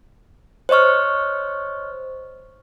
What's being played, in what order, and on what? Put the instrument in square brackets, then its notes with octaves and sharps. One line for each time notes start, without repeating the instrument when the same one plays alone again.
[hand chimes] C5 C#5 D#5 C#6 F6